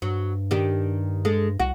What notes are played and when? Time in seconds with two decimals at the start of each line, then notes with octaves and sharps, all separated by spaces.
0.02 G2 F#3
0.51 D#3 D4 G4
1.25 G#3 A4
1.60 C2 F#4